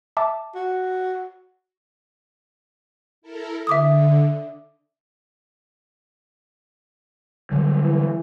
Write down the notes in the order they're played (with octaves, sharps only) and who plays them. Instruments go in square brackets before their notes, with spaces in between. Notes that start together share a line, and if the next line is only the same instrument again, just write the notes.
[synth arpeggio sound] E5 A5 D6
[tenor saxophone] F#4
[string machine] E4 A4 A#4
[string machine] D3 [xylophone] E5 D6 D#6
[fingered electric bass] D3 F#3 G3
[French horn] E3